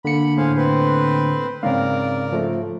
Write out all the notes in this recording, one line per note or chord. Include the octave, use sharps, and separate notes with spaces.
D3 A#3 B5 C#7
A2 G#4 C5 F5
C4 B4 C5
G#2 C#3 C4 A#4 D5 F5
F3 A3